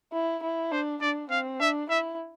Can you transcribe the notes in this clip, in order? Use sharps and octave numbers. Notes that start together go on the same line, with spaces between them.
E4
E4
D4 C5
D4 D5
C4 F5
D4 E5
E4 E5